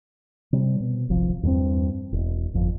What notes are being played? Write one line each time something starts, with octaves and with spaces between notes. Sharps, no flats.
C3 G3
B2
D1 G#1 C3 F3
E2 G2 B3 C4
E1
G1 F2